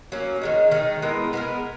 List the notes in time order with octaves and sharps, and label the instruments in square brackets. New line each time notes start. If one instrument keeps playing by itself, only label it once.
[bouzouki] F#3 A#3 C#4
D#3 G#3 D#4
D#3 G#3 D#4
G#3 B3 E4 A#4
G#3 B3 E4 A#4